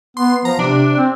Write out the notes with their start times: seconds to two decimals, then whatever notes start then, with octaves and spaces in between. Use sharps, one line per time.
0.17 B3 C6
0.45 F3 A#5
0.59 C3 D4
0.97 C4